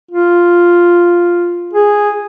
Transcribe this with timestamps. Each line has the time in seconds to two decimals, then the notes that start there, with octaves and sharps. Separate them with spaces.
0.11 F4
1.74 G#4